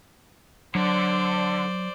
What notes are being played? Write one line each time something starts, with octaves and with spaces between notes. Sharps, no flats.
D3 F#3 C5 D5